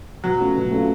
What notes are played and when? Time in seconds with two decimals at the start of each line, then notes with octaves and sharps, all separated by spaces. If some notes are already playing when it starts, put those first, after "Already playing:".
0.24 B2 F#3
0.40 A3 C#4 F4
0.56 B2
0.71 A3 C#4 F4